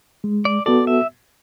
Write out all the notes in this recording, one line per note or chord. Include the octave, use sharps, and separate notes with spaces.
G#3
D5
B3 F#4 A4 D5
E5